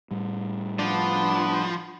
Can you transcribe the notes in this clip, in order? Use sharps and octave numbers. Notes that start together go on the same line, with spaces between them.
A2 G3
F3 B3 D4